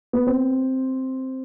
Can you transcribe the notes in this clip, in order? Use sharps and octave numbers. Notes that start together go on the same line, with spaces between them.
B3
C4